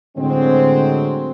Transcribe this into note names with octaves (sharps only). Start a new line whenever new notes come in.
A2 D3 F#3 G#3 C4